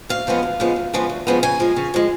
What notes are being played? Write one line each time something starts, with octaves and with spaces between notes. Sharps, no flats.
D2 F5
C#3 F3 G#3 B3
D2
C#3 F3 G#3 B3
D2
C#3 F3 G#3 B3
D2
C#3 F3 G#3 B3
C#3 G#5
F3 G#3
C#3
F3 G#3